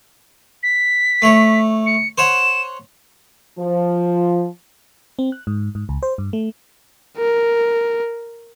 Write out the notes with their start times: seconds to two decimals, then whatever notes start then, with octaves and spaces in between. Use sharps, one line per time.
0.62 B6
1.22 A3 C#5
1.86 C#7
2.18 C5 C#5 F#5 E7
3.59 F3
5.19 C4
5.32 F#6
5.47 G#2
5.75 G#2
5.89 C#2
6.03 C5
6.18 G2
6.33 A3
7.18 A#4